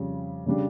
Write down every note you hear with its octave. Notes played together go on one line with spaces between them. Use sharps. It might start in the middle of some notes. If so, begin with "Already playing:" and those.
Already playing: F2 C#3 G3
C#3 G3 D4